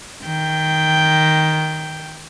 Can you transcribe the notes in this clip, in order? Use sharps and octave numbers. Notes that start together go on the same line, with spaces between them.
D#3 G5